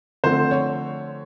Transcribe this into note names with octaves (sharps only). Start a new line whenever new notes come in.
D3 F3 A3 C4 C5
C#5